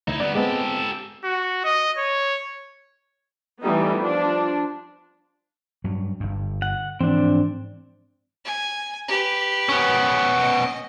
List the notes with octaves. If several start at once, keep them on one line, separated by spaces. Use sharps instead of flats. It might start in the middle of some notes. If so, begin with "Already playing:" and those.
D2 D#4 E4 G#6
G3 B3 D5
G#3 B3 C4 G4 A4
F#4
D#5
C#5
E3 G3 A3 B3 D#4
F3 D4
G2 F#3
G1 G2
F#5
G#2 E3 F3 C4 D4
G#5
G4 B4
B3 C#4
D#5